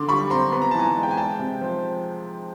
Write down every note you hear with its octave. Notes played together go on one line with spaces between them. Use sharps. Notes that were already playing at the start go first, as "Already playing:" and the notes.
Already playing: D3 C6 D6
G3 B5 C#6
C4 A#5 C6
B3 B5
A#5
E3 A5
G#5 A#5
G#3
G5
G#5
G#3 G5 A5
C3
F3